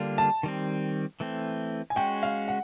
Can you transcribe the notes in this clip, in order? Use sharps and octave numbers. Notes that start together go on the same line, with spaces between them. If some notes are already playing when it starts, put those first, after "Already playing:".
Already playing: D3 G3 A#3 D4 F4
A5
D#3 G3 C4
E3 A3 C4
G#5
G#3 C#4 F#4 G5
F5
F#5